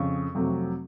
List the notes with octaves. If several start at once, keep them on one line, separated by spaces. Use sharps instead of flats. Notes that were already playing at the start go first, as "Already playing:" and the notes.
Already playing: F2 C#3 C#6
F2 C3 F#3 A3